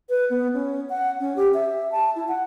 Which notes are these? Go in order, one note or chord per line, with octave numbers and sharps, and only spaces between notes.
B4
B3
C#4
F#5
C#4
G4
E5
A5
E4
F#5